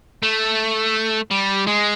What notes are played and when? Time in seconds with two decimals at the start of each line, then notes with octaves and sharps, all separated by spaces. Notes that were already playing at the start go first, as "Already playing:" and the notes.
0.23 A3
1.31 G3
1.67 G#3